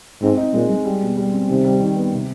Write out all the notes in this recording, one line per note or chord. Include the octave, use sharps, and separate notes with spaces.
G#2 C4
D#4
A#2 G#3
G#3
G3
B2
G3
C4
C3 D#3
G3
D#3
B3
C3